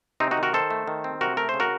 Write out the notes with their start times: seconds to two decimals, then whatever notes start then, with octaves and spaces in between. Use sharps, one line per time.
0.20 C3 C4 D#4
0.31 D#4 F#4
0.37 D#3
0.43 F#4 A#4
0.54 D#3 A4 C5
0.70 A3
0.87 D#3
1.04 C4
1.21 C3 F#4 A#4
1.37 A3 A#4
1.49 C5
1.54 C#3
1.60 F#4 A#4